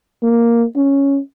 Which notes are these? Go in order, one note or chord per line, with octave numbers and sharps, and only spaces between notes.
A#3
C#4